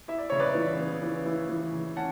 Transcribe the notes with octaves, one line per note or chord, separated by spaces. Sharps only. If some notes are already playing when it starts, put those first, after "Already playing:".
E4 E5
D5
C#3 C#5
B4 D5
E3
B3
E3
E4
E3
C#3
C#4 F#5 A5